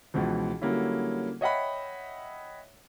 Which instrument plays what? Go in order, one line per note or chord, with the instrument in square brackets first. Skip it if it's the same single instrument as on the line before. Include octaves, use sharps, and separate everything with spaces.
[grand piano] C#2 B2 E3 F3
D3 F#3 G3 A#3 C#4 E4
C#5 D#5 E5 F#5 G5 B5